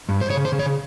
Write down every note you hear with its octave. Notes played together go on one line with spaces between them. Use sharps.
G2
C5
C#3 C#5
C5
C#3
C#5